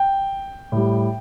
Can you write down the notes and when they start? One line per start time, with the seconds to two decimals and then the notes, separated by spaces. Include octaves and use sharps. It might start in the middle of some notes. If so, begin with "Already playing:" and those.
Already playing: G5
0.72 A2 G3